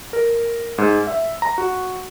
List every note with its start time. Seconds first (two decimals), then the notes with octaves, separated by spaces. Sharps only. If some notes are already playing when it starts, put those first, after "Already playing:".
0.13 A#4
0.78 G#2
1.07 E5
1.42 A#5
1.58 F#4